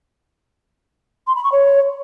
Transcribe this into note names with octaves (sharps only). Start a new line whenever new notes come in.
C6
B5
C#6
C#5